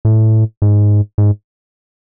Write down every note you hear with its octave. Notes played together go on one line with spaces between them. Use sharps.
A2
G#2
G#2